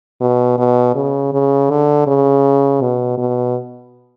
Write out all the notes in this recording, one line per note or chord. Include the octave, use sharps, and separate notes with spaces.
B2
B2
C#3
C#3
D3
C#3
B2
B2